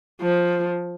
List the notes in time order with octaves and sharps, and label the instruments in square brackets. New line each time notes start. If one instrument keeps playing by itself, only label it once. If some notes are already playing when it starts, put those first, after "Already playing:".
[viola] F3